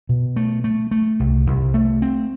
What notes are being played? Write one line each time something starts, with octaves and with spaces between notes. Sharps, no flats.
B2
A3
A3
A3
C2
C2
A3
C4